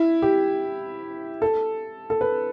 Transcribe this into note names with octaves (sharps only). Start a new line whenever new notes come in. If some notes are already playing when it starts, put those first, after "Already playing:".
Already playing: E4
G4
A4
A4
B4